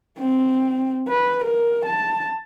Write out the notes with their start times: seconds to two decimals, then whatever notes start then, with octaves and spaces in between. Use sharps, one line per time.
0.18 C4
1.08 B4
1.44 A#4
1.86 A5